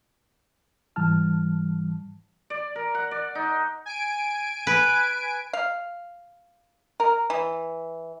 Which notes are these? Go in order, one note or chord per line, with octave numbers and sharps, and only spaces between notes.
G#2 E3 G3 A5 F6
D5
A#4
F#5
D5
D#4
G#5 D7
B4
F5
A#4
E3